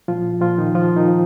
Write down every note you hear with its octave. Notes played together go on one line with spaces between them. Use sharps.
A#2 F3 F4
A#2 F3 F4
D#3 D#4
F3 F4
D#3 D#4
F3